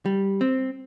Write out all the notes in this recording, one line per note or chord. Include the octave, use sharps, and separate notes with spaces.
G3
C4